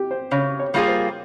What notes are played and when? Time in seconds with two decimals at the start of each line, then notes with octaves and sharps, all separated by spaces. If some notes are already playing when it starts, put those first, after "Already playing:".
Already playing: G4
0.11 C5
0.31 C#3 C#5
0.59 C#5
0.74 G3 A#3 F4 G#4
0.88 C5